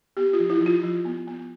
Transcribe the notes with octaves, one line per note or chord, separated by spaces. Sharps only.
B3 G4
F4
F3
E4
F3
F4
F3
B3
B3